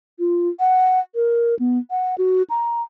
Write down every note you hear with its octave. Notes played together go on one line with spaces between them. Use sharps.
F4
F#5
A#4
B3
F#5
F#4
A#5